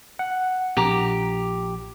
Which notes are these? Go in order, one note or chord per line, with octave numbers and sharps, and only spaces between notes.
F#5
A#1 G4 A#5 D6